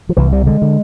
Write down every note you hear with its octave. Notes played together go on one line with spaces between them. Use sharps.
F3
C2 E3
C3 G3
D3 G#3
D3